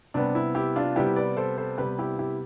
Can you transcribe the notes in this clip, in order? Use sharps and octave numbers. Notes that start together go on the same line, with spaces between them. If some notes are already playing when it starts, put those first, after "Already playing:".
C3 G3 B3 D4
E4
E4 G4
D4 F4
C3 G3 B3 E4 G4
B4 D5
A4 C5
A4 C5
C3 G3 B3 G4 B4
E4 G4
E4 G4